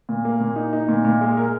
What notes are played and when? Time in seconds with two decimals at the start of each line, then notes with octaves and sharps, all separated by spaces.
0.09 A#2
0.25 A#3
0.40 A#2
0.56 D#4
0.73 D#4
0.88 A#2
1.05 A#2
1.21 G#3
1.37 A#4